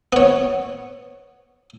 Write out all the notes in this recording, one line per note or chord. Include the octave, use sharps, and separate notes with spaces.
B3 C#5